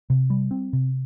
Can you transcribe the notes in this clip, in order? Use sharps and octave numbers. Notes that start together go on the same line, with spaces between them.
C3
G3
C4
C3